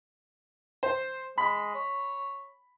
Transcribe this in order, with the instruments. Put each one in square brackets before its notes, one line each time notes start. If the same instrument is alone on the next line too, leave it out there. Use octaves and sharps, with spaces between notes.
[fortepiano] C5
[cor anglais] G#3 [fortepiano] B5
[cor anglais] C#5